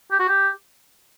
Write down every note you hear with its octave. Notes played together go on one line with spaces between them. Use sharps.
G4
F#4
G4